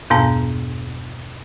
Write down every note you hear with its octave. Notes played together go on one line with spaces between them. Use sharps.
E2 G2 B2 B3 A5 A#5